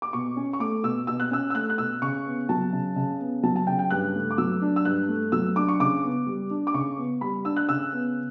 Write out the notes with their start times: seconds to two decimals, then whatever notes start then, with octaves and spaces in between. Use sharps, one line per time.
0.02 D6
0.13 B2 C#6
0.36 C#4
0.53 C#6
0.60 A3 D6
0.83 B2 E6
1.07 B2 E6
1.20 F#6
1.31 C#4 E6
1.50 E6
1.54 A3 F#6
1.70 F#6
1.78 B2 E6
2.02 C#3 C#6
2.26 B3
2.49 F#3 A5
2.73 C#3
2.96 C#3
3.20 B3
3.43 F#3 A5
3.56 A5
3.67 C#3 G5
3.79 G5
3.90 G2 F#6
4.15 A3
4.31 D6
4.38 F#3 E6
4.62 D4
4.76 E6
4.85 G2 F#6
5.08 A3
5.32 F#3 E6
5.56 D4 D6
5.68 C#6
5.80 C#3 D6
6.03 B3
6.27 G3
6.51 D4
6.67 D6
6.74 C#3 C#6
6.98 B3
7.21 G3 B5
7.45 D4 E6
7.56 F#6
7.69 C#3 E6
7.93 B3